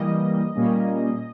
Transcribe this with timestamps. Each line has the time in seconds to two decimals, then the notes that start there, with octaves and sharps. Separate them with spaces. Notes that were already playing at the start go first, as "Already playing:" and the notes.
Already playing: E3 G3 A#3 D#5
0.55 A#2 G3 A#3 C#4